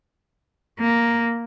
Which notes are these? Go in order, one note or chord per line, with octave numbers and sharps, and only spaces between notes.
A#3